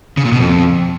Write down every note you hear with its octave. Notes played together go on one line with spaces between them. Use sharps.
C#3
A#2
B2
F2